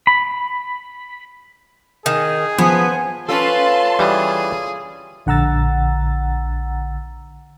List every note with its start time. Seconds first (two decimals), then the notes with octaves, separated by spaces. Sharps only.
0.07 B5
2.06 D#3 G#4
2.58 F3 B3 C5 G#5
3.29 C#4 F4 A4 B4 A5 C6
3.99 E3 G3 G#4
5.26 A#1 D3 F#5 A#5 E6 A6